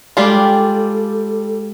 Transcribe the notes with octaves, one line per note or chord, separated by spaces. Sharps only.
G3 G#3 D4 F4 G4 A4 F5